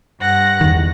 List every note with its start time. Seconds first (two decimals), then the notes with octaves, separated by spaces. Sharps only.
0.20 G2 F#5 A#6
0.61 E2 D#3